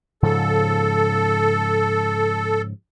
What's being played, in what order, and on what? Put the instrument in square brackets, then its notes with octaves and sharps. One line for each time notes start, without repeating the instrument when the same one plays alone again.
[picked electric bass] G#2 C#3 F3 [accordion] A4